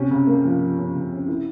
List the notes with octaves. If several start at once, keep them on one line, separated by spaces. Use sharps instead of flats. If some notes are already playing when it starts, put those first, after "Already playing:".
Already playing: C3 C#4
C#3
A#3
F3
F3
C#4
C#3
C#4
E4